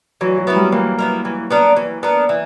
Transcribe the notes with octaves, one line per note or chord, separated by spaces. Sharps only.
E3 F#3
F#3
B3 E4 A#4
G3
E3 A#3
B3 E4 A#4
E3
B3 D4 A#4
E3
B3 D4 A#4
E3